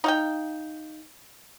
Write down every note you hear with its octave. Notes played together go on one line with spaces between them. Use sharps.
D#4 F5 G5